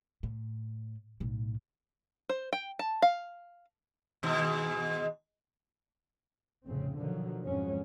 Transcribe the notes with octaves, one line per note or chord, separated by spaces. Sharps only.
A2
B1 A2
C5
G5
A5
F5
D#2 G#2 B2
F1 A2 C#3 C4
B2 D3 D#3 F3 F#3
F2 G#2 F#3 G#3 C#4